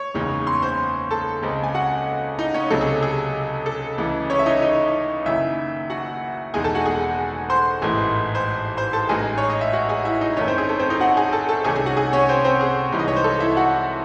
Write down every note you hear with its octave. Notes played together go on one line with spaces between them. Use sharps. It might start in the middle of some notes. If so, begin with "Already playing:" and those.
Already playing: C#5 C#6
F#1 E2 C#3 G#3 D#4
C6
C#6
C5 C6
A4 A5
C#2 C#3 G#3 C4
G#5
F#4 F#5
D#4 D#5
C#4 C#5
C#2 C3 F#3 A4
G#4
G#4
A4
C#2 C#3 E3
C#4 C#5
E5
D#4 D#5
D#4 D#5
F#1 F#2 D#3 E4 E5
F#4 F#5
E1 E2 D#3 G#3 D#4 G#4 G#5
A4 A5
F#4 F#5
G#4 G#5
C5 C6
A1 G#2 E3 A3
C5 C6
C5 C6
A4 A5
A1 A2 G#3 D#4 G#4 G#5
C#5
D#5
E5
F#4 F#5
G#4 G#5
E4 E5
D#4 D#5
G#1 F#2 D#3 A3 C#4 C#5
C4 C5
G#4
A4
C4 C5
D#4 D#5
F#4 F#5
G#4 G#5
A4 A5
A4 A5
C2 C3 D#3 A3 C#4 G#4 G#5
G#4 G#5
F#4 F#5
G#4 G#5
C#4 C#5
C4 C5
C4 C5
G#4
C2 C3 E3 G#3 D#4
D#5
C#5
C5
A4
E4 E5
F#4 F#5